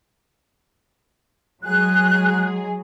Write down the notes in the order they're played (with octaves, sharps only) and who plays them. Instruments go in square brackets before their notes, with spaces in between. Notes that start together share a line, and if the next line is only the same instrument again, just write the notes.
[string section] F#3 G#3 G#4 [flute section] F#6